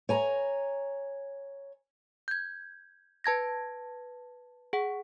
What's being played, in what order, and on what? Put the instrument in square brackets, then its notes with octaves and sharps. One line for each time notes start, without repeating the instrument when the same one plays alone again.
[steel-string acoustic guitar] C#5 G#5 A#5
[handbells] G6 G#6
B4 A5 G#6 A#6
G#4 F#5